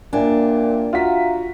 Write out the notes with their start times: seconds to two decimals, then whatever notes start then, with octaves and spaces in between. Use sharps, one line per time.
0.13 A#2 A#3 D4 E5 G5 G#5
0.93 F4 F#4 E5 F5 A#5 B6